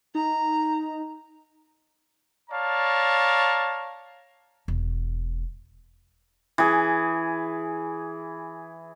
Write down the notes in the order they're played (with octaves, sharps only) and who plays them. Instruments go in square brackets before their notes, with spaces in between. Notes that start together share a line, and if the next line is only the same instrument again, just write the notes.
[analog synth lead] D#4 [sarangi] A#5
[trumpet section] C#5 D5 F5 A5 A#5
[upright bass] E1
[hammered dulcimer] E3 G#4